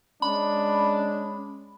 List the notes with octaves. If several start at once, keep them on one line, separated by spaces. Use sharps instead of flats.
G#3 C#4 D4 B5